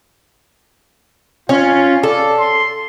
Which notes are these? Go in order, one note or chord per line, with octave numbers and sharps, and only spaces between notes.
C#4 F4
A4 D5
C6